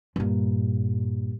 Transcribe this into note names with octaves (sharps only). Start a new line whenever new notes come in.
G2 A#2